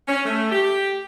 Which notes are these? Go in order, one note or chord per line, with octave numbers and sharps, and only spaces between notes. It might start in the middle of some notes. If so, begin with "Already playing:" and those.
C#4
A3
G4